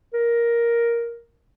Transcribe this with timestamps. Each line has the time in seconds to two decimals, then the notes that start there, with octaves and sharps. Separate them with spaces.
0.14 A#4